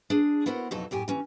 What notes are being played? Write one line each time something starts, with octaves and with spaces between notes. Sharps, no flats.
D4 G#4
B3 E4 F#4 A#4 C5 F#5
F2 B2 F#3 D#4 A4
F#2 A2 G4 G#5
E3 C#4